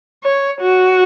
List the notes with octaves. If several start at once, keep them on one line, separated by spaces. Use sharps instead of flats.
C#5
F#4